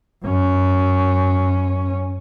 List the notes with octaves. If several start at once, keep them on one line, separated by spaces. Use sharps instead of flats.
F#2 C#4